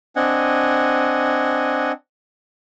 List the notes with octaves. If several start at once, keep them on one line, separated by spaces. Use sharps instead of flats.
C4 D4 D#5 F#5 G#5